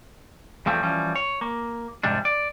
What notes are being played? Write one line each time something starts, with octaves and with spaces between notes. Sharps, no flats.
E2 F3 G3 A3 C4
E3 F3 G3 C#4
C#5
A#3
F2 G#2 C3 G3 D4
D5